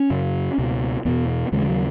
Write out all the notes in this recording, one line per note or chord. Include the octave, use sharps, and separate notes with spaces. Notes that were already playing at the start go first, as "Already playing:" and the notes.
Already playing: C#4
F#2 C#3
C#2 B2
E2 B2 B3
B3
D#2 C#3 G#3
E3
F#3